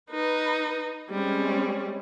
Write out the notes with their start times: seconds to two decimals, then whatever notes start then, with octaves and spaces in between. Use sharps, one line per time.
0.11 D#4 B4
1.10 G3 G#3 C4 C#4